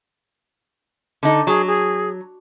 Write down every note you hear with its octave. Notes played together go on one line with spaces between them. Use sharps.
D3 D#4
F#3 G#4
G#4